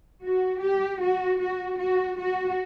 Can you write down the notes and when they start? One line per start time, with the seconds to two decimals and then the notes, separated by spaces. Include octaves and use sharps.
0.23 F#4
0.62 G4
1.01 F#4
1.40 F#4
1.79 F#4
2.19 F#4